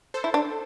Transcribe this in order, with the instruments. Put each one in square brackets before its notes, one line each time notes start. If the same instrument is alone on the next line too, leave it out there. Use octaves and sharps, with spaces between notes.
[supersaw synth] A4 C5
[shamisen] E4
D4